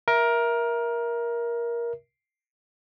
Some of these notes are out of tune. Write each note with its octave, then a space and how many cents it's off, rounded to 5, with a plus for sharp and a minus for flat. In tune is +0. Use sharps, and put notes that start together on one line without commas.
A#4 +15 E5 +0